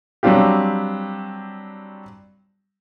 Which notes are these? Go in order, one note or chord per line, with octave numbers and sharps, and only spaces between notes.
F#3 G3 C4 D4 F4 G4